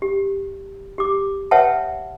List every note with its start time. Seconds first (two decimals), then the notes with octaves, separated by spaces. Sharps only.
0.02 G4
0.98 G4 D6
1.51 B4 C#5 E5 F#5 G5 A5